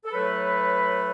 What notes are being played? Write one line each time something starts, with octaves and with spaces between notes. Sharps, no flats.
A4
A2 F#3 A3 B4